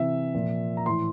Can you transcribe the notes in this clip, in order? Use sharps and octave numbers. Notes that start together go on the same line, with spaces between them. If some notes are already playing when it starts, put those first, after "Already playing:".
Already playing: C3 E3 E5
A#2 F3
A#5
A2 E3 C6